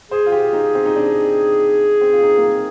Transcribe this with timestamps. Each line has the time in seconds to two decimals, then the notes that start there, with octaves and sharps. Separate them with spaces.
0.11 G#4 C5
0.26 F4
0.32 G4
0.53 D#4
0.75 C4
0.85 D#4
0.96 D4
2.01 C4
2.13 F4
2.22 D#4
2.38 A#3
2.43 C4